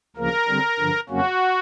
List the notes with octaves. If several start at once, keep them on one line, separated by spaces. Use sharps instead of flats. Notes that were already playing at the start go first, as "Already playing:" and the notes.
D2 C#3 F3 A#3 A#4
D3 G3 C4
G2 D3 F3
F2 C#3 F#3 A#3 C#4 F#4